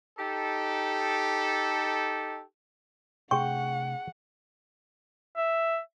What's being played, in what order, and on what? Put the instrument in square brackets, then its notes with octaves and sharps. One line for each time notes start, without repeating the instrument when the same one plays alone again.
[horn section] D#4 G4 A4
[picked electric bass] C3 A3 D4 [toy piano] G#4 C#6 [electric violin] F#5 [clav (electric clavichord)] G5
[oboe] E5